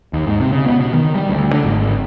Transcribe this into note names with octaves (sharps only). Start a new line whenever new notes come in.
D#2
G#2
C3
C#3
B3
B2
D#3
G3
D2
D3
G#1